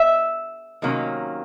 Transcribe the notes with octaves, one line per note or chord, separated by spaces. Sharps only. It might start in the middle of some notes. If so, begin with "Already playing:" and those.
Already playing: E5
C3 D#3 F#3 A#3 C#4